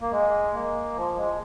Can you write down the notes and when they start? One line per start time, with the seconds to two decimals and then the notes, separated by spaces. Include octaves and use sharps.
0.01 A#3
0.12 G#3
0.54 A#3
0.96 F3
1.17 G#3